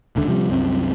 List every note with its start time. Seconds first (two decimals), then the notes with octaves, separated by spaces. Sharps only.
0.16 D#1 C#2 D3
0.28 C3 F3 G3
0.50 C2 F#2 C4